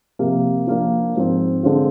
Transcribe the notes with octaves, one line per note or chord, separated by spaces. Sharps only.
C3 F3 A#3
F3 A#3 D4
G#2 F3 C4
D3 G#3 C4 F4